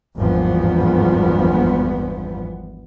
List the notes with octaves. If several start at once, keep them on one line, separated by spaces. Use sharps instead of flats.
G#1 E2 G2 F3 B3